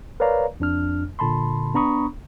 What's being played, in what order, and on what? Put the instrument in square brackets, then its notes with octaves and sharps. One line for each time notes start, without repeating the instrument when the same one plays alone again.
[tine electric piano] A#4 B4 C#5 D5 F5 A#5
F2 D4 F6
A#2 D3 A5 B5 C6
B3 D4 A#5 B5 C#6 D#6